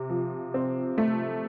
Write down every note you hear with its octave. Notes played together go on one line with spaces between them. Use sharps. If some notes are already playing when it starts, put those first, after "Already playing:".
Already playing: C3
F3
C4
A3